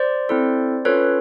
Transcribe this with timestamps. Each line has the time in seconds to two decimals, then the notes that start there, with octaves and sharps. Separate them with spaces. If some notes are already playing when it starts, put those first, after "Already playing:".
Already playing: C5 D5
0.29 C4 E4 A4
0.85 C#4 F4 A4 B4 C#5